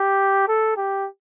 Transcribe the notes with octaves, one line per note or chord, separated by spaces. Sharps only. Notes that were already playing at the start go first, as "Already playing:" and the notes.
Already playing: G4
A4
G4